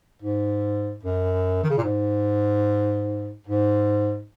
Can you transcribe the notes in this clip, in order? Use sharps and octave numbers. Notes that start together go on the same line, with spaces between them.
G#2
F#2
D#3
C#3
A#2
G#2
G#2